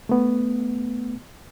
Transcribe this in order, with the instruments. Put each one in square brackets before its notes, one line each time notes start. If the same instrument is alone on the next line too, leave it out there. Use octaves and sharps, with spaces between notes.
[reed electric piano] A3 B3